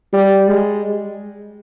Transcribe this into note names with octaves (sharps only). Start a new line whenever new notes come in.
G3
G#3